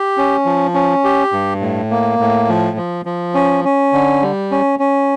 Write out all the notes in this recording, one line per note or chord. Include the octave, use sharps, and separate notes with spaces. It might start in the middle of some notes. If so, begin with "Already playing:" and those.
Already playing: G4
C#4
F3
C#4
G4
G2
A2
A#3
A2
F3
F3
F3
C#4
C#4
D3
G3
C#4
C#4